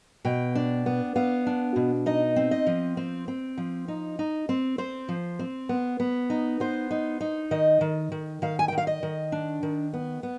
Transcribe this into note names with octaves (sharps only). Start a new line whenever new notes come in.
B2 G5
D4
B3
B3 F5
D4
B2
D#4 D#5
C4
D#5
F3
C4
C4
F3
D#4
D#4
C4
C4 C5
F3
C4
B3
B3
D#4
B3 C5
D#4
D#4
D#3 D#5
D#3
D#3
D#3 F5
G#5
D#3 G5
F5
D#5
D#3
D4
D#3
B3
B3